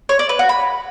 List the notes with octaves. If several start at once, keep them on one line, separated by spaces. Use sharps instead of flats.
C#5
D5
B4
F#4
B5